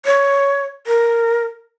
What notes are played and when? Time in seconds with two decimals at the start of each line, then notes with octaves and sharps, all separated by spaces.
0.06 C#5
0.87 A#4